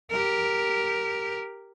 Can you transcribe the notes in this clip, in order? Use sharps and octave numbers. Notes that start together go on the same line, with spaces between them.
G4 A#4